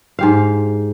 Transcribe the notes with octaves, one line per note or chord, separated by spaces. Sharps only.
G#2 G4 F5